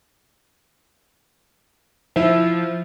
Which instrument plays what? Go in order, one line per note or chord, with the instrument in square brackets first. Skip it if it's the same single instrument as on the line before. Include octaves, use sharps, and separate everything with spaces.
[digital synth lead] F3 [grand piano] E4 E5